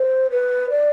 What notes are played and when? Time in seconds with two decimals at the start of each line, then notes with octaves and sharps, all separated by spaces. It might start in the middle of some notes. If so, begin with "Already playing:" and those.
Already playing: C5
0.31 B4
0.70 D5